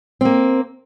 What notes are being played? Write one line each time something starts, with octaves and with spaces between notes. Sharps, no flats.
A#3 C4